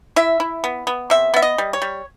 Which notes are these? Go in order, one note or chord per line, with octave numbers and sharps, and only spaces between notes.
E4 E5
E4
B3
B3
C3 E5
B3 E5
D#5
G3
C#5
G3